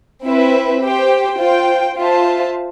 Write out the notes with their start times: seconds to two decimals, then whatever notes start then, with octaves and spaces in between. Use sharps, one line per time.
0.25 C4 E4 B4 E5
0.83 G4 C5 G5
1.40 F4 C5 G5
1.97 F4 C5 E5 A5